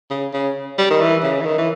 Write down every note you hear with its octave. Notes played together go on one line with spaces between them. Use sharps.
C#3
C#3
G3
D#3
E3
C#3
E3
D#3
E3